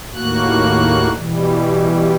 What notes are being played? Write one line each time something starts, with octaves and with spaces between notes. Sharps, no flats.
D#2 A2 A#3 F#4 F#6
B2 E3 G3